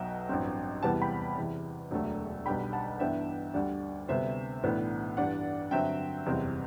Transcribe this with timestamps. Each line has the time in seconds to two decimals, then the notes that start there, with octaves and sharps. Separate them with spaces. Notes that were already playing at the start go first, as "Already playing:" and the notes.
Already playing: B1 B2 F#3 E5 G5
0.29 A1 G2 F#3 C4
0.83 E2 C3 E3 G3 B3 F#5 A5
1.01 G5 B5
1.37 E2 C3 E3
1.91 E1 D2 D3 F#3 A3
2.46 B1 B2 G3 D4 G5 B5
2.73 F#5 A5
3.00 G2 E3 B3 D4 E5 G5
3.54 D2 D3 G3 D5 F#5
4.08 D2 C3 G3 B3 C5 E5
4.63 B1 A2 E3 B3 D4
5.17 G2 E3 G3 D4 D5 F#5
5.71 G2 D3 F#3 C4 E5 G5
6.26 F#1 E2 C3 G3 C4